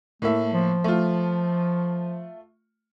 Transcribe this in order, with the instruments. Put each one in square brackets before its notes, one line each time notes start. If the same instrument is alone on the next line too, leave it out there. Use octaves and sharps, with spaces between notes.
[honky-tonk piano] A2 A#3 E5 [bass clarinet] A3
[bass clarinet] F3
[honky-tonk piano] A3 F4